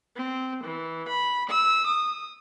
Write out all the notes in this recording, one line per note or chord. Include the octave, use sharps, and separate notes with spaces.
C4
E3
B5
E6
D#6